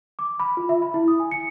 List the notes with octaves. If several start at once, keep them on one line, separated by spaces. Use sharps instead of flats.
D6
B5
F4
E5
B5
E4
D#6
G#5
C#7